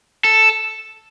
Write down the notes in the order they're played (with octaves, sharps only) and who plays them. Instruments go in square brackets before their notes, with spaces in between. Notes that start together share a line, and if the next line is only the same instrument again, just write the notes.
[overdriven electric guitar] A4